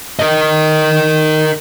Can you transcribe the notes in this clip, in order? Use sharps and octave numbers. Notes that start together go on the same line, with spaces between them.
A#4 D#5